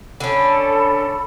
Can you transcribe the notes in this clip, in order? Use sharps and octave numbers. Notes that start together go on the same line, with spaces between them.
D3 C#4 A4 B5